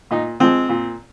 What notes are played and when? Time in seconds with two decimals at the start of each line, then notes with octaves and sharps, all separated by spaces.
0.11 A#2 D#4
0.40 F3 G#3 C4
0.69 A#2